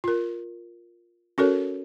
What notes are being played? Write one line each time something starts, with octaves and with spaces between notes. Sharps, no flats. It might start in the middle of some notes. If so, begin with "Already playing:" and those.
F4 A#4
C#4 F#4 A4 A#4 C#5